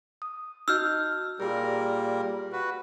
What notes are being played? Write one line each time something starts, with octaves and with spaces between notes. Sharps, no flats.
D#6
D#4 F#4 D#5 E6 F6 G6
A#2 G3 G4 G#4 A#4
F#4 B4